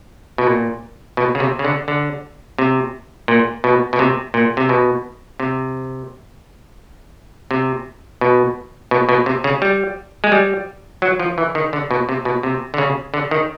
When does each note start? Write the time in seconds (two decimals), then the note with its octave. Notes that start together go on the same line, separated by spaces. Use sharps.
0.38 B2
0.47 A#2
1.17 B2
1.35 C#3
1.40 C3
1.59 C#3
1.65 D3
1.88 D3
2.58 C3
3.28 A#2
3.64 B2
3.93 B2
3.99 C3
4.34 A#2
4.57 C3
4.69 B2
5.40 C3
7.51 C3
8.21 B2
8.91 B2
9.09 B2
9.26 C3
9.44 C#3
9.62 G3
10.24 G#3
10.32 G3
11.02 F#3
11.19 F3
11.38 E3
11.55 D#3
11.73 D3
11.91 B2
12.09 C3
12.25 B2
12.43 C3
12.74 D3
12.78 C#3
13.14 D3
13.31 D#3